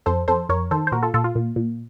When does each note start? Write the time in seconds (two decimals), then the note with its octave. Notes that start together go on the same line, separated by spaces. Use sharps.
0.06 F2 A4 C5
0.28 F2 A4 C5
0.49 F2 A#4 C#5
0.71 D#3 A4 C5
0.87 C5
0.92 A#2 F#4 A#4
1.03 F4 A4
1.14 A#2 F4 A4
1.24 F4
1.35 A#2
1.56 A#2